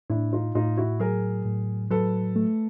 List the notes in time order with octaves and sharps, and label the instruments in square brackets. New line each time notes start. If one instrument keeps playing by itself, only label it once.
[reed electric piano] A2 [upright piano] D4 E4
[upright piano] D#4 F4
[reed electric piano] A2 [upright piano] D#4 F4
[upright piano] E4 F#4
[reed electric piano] F#3 [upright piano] G#4 A#4
[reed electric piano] A2
[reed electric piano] F#3 [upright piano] A4 B4
[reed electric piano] A3